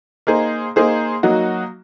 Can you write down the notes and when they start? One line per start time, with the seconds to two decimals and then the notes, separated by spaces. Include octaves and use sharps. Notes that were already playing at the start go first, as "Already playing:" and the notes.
0.27 A#3 D#4 G#4 C5
0.76 A#3 D#4 G#4 C5
1.23 F#3 A#3 D#4 F#4